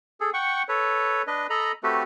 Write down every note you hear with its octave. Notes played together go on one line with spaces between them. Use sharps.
G#4 A4
F#5 G5 C#6
A4 B4 C#5
D4 B4 D#5
A4 D#5 A#5 B5
A3 C4 F#4 G4 A4 B4